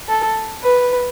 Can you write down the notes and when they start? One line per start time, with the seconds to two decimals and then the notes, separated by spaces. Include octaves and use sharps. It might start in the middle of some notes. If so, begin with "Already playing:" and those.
0.09 A4
0.63 B4